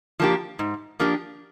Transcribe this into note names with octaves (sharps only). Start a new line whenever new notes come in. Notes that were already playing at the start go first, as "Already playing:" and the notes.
F3 A#3 D4 G4
G#2
F3 A#3 D4 G4